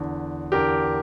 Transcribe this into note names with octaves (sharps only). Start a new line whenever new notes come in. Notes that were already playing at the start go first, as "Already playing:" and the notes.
Already playing: E2 D3
E2 D3 G4 A#4